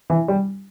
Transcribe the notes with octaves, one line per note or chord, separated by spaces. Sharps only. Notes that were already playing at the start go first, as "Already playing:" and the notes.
E3
G3